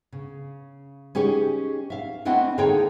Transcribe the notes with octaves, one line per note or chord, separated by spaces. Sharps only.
C#3
C#4 D#4 G4 G#4 C#5
E5 F5
A3 C4 D4 E4 D#5 F#5
D3 A#3 D#4 G#4 C#5 G5